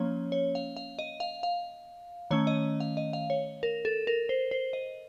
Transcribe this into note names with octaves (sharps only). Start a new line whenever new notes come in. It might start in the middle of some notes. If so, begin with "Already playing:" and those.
Already playing: F3 A#3 C#4 C#5
C#5
F5
F5
D#5
F5
F5
D#3 A3 C#4 C#5
D#5
F5
D#5
F5
C#5
A#4
A4
A#4
C5
C5
D#5